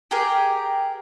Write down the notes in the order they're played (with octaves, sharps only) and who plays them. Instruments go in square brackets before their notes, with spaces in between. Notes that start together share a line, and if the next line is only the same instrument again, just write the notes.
[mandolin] G4 G#4 A#4